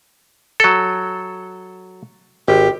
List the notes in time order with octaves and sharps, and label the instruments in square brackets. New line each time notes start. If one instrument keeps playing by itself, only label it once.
[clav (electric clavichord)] F#3 A4
[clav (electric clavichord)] G#1 [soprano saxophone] G4